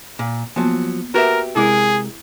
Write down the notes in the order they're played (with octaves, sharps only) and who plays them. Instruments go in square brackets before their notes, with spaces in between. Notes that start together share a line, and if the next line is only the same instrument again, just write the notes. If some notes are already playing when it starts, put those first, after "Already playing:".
[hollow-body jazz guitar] A#2
[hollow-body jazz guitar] F3 F#3 [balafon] A#3 B3
[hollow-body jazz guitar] F#4 G4 E5 [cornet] A#4 [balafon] B4
[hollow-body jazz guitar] C3 G#3 A#4 [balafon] E4 D6 [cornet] G#4